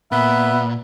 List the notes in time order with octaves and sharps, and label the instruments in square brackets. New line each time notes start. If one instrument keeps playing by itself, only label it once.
[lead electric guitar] A#2 [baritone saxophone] B3 [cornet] E5 [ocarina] B5